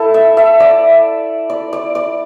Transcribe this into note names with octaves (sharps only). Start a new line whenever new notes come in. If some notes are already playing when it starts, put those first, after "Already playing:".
Already playing: E4 A4
E5
E5
D5
D5
D5
D5